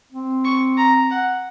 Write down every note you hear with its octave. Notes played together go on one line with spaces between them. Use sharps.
C4
C#6
A#5
F#5